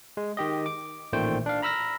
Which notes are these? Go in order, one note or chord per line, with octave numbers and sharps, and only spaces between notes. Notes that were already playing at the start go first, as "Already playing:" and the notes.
G#3
D#3 G4 D#5
D6
A1 A#2 D#3 A3 C5 G5
D4 F5
A#5 B5 E6 F6 A#6